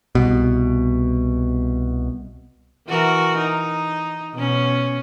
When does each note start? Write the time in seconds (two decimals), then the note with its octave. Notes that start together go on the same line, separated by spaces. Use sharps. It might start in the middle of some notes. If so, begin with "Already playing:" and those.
0.15 C2 B2
2.88 E3 F#4 A#4
3.37 D#4
4.34 B2 C#4